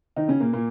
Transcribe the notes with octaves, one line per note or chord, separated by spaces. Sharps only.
D#3 D#4
C#3 C#4
A#2 A#3
A#2 A#3